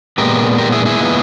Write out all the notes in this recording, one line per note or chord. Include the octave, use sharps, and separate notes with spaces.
A#2 G#3 B3 G4 A#4
G4 A#4
E4 G#4
E4 G#4
A#2 G#3 B3